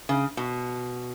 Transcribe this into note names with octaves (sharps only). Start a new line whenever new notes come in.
C#3
B2